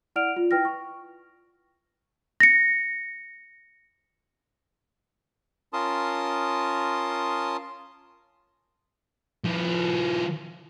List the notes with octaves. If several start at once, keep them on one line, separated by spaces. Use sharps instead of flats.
E4 D5 F#5 F6 D7 F7
F4
E4 B4 G5 F6 A#6
C#6
A#6 C#7
C#4 F4 A#4 A5 C6 D#6
F3 E4